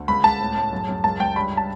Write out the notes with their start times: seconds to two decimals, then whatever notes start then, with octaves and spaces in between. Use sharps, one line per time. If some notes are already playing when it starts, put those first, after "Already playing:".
Already playing: D2
0.08 C#2 B5
0.24 C#2 A5
0.40 A2
0.57 A2
0.73 F#2
0.89 F#2
1.04 C#2 A5
1.19 C#2 G5
1.36 G2 B5
1.57 A5